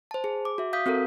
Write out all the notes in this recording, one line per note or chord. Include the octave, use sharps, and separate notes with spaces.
C5 A5
G#4
D6
F#4 E5
F5 D#6 G6 B6
C4 F#4 A4 A#4